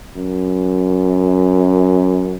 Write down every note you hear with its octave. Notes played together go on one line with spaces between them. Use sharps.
F#2